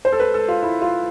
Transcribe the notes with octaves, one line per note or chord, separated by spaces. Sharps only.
C5
A4
B4
A4
F4
E4
F4